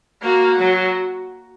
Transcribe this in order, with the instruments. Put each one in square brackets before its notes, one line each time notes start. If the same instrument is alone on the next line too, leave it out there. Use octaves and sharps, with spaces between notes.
[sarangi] A#3 [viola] F#4
[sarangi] F#3